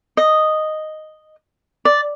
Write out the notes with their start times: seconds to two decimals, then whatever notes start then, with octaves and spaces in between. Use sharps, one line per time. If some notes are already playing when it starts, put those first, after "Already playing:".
0.17 D#5
1.85 D5